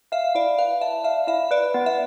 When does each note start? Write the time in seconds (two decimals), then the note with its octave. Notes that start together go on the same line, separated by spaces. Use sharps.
0.12 E5 F5
0.35 E4 D5
0.58 B4 F5
0.81 E5 A5
1.04 E5 F5
1.27 E4 E5
1.51 B4 D5
1.74 B3
1.86 E5